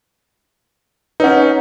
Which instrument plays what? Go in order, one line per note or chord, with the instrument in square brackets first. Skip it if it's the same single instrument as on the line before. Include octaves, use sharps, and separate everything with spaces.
[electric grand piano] C#4 D#4 [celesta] B4 C#5 F#5